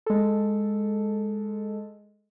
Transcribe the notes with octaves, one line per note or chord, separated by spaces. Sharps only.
G#3 A4